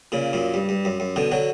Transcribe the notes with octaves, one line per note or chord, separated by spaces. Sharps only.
A#2 C#3
F#2 A#2
G2
G2
F#2
F#2
B2 D3
D3 F#3